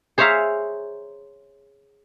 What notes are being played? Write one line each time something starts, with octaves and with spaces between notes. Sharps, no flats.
G#4 C5 C#5 E5 F5 A#5